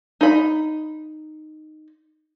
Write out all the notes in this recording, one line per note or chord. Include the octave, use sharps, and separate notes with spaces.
D#4 B5